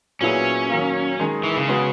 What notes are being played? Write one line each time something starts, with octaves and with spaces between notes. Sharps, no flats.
A#2 F#3 B3 C#4 E4 G#4
D#3 F#3 A#3
D#3 G#3 D#4 G#4
E3
C#3
G#3 B3 F#4